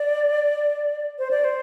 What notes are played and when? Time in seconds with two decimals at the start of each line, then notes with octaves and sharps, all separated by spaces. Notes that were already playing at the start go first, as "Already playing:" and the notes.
Already playing: D5
1.19 C5
1.31 D5
1.44 C5